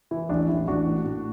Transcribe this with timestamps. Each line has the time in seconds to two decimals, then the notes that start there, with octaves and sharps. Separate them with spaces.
0.11 E3 E4
0.29 A1 D4
0.48 A1 E4
0.68 A1 D4 F#4
0.86 A2
1.06 A2